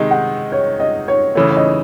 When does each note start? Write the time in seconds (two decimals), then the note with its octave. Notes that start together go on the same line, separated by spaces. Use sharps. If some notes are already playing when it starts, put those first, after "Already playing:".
Already playing: C3 D#3 G#3 D#4
0.11 F#5
0.52 C#5
0.80 D#5
1.08 C#5
1.35 C#3 E3 A3 C#5
1.50 C#5
1.56 D#5